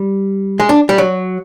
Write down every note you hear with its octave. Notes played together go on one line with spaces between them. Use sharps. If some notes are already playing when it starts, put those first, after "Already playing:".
Already playing: G3
G#3
D4
G3
F#3